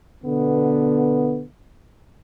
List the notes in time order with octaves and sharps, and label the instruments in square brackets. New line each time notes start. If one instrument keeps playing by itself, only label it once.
[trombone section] B2 D3 B3